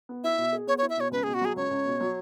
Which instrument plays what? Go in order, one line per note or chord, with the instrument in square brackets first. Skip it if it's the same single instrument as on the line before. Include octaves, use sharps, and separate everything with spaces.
[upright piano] B3
[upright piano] E4 [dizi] E5
[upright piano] B2
G#4
[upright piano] B3 [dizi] C#5
[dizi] C#5
[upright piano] E4
[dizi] E5
[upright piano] B2 [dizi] C#5
[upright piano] C#2 [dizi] B4
[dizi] G#4
[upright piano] B2
[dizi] F#4
[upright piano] F#3 [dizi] G#4
[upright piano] C#2 [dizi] C#5
[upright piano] C#2
B2
F#3